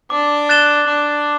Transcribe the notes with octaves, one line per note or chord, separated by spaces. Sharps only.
D4 D6
F#6 A6 E7 G7
D4 D6